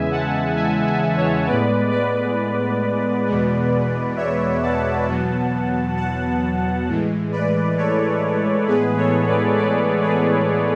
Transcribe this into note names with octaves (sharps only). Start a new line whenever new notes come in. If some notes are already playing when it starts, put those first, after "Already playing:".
Already playing: E2 C#3 E3 G#3 E5 G#5
F#5 A5
E5 G#5
E5 G#5
C#5 E5
A2 G#3 B3 B4 D5
B4 D5
E2 B2 G#3 B3
C#5 E5
F#5 A5
E2 B2 F#3 B3
F#5 A5
A2 E3 G#3
B4 D5
A4 C#5
A2 E3 G#3 B3 G#4 B4
A4 C#5
B4 D5
B4 D5
G#4 B4